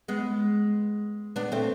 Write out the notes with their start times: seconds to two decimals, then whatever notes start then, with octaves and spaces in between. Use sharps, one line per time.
0.08 G#3 B3
1.36 B3 D4
1.52 A3 C4